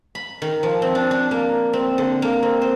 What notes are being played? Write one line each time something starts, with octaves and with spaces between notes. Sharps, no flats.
B5
D#3
F3
C4
D4
D4
A#3
C4
D3
A#3
C4
C5